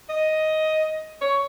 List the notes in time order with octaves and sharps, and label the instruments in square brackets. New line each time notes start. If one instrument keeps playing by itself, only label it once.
[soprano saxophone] D#5
C#5